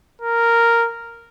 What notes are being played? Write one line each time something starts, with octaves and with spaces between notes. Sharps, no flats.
A#4